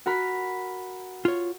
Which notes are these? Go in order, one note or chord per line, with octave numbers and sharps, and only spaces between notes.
F#4 A#4 B5
F4 C#5